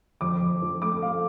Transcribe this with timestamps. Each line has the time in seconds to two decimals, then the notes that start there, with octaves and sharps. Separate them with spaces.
0.21 F2 D6
0.41 F2
0.62 F3
0.82 A3 D6
1.02 A3 F5